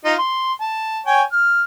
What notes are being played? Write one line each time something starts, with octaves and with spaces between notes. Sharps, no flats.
D#4 F4
C6
A5
C#5 G5 G#5
F6